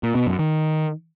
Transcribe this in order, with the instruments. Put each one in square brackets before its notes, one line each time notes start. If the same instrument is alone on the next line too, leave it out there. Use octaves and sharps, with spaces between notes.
[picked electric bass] A#2
B2
F#2
D#3